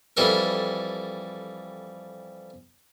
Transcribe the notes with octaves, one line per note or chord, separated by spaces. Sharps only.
F2 E3 G3 A4 A#4